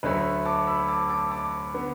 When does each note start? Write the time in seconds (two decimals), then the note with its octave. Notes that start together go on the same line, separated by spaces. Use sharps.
0.03 D2 D3 F#3 A3 B4
0.45 A5 D6
0.67 B5 E6
0.89 A5 D6
1.09 A5 D6
1.31 A5 D6
1.74 D3 B3